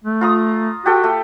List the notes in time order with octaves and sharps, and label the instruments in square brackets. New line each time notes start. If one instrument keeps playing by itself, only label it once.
[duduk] A3
[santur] F4 A#5 D#6
[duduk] F#4 [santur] G4 A4 G5
[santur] A3